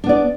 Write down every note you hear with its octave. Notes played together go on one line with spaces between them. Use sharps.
B3 D4 D5